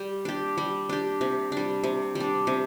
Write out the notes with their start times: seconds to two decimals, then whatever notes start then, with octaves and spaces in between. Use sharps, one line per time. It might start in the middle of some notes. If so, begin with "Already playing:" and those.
Already playing: G3 G4
0.25 D4 G4
0.58 G3
0.89 D4 G4
1.21 C3
1.52 G3 D4
1.84 C3
2.15 G3 D4
2.47 C3